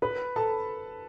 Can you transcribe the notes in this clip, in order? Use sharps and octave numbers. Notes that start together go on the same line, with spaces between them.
B4 B5
A4 A5